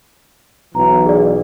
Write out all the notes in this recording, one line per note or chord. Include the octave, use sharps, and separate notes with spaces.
B1 E3 A#5
G#4 D5